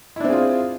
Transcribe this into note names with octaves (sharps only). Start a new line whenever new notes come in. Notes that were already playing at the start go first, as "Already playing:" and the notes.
C4 D4 E4 F4 G#4